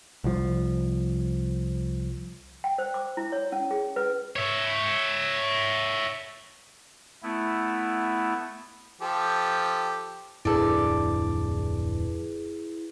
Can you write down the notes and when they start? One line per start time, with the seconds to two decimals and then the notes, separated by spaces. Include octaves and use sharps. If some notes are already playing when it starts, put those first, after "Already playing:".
0.24 C2 F3
2.64 G5
2.78 C5
2.94 D6
3.17 E4
3.32 C#5
3.52 C#4
3.71 G#4
3.96 B4
4.36 C#5 E5
7.23 A3 B3 E4
9.01 F3 G4 A4
10.45 D1 F2 D4 E4 G#4 A4 B4 D5